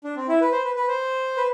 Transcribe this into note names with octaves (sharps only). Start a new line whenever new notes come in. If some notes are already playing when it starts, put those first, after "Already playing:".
D4
C4
E4
B4
C5
B4
B4
C5
B4